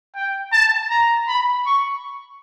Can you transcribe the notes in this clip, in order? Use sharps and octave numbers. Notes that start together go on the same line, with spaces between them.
G5
A5
A#5
B5
C#6